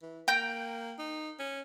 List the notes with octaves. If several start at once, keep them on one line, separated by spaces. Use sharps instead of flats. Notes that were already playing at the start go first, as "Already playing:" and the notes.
E3
A#3 G5 A#5 G6
D#4
C#4